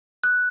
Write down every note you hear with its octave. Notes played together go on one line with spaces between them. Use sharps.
F#6